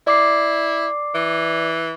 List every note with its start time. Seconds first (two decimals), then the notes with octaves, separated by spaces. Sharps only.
0.07 E4 D5 D6 C7
1.15 E3